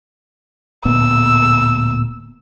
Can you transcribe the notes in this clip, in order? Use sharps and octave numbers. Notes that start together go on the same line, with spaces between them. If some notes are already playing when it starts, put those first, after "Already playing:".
D1 A#2 B3 E6